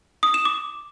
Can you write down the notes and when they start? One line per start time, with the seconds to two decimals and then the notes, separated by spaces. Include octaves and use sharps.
0.23 D#6
0.34 E7
0.45 D6